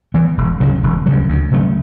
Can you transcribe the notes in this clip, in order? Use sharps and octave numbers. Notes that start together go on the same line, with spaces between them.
E3 B3
E1
D2 C#3 F#3
E1
D2 C#3 F#3
D2
C#3 F#3 A3